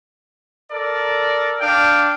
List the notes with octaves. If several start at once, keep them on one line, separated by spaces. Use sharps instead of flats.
A4 A#4 D5
D4 F5 G5